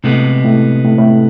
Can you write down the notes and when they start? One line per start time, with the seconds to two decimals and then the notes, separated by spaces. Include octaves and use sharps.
0.04 A2 C3 G#3 B3
0.44 A2
0.85 A2
0.98 A2